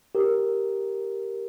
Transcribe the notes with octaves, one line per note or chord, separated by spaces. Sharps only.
G4 A#4